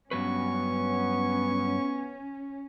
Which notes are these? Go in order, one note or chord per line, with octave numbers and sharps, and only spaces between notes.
G2 F#3 B3 C#4 B4 C#6